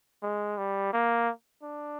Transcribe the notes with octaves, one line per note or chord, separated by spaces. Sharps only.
G#3
G3
A#3
D4